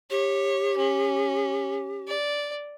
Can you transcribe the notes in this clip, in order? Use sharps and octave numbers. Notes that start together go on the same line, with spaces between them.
G4 C#5
C#4
D5